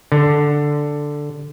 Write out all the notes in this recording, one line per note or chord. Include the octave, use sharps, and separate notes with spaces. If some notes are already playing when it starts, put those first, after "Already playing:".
D3